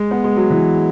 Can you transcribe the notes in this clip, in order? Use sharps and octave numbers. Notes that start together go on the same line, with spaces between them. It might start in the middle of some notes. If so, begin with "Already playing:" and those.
Already playing: G#3
B3
G#3
F#3
E3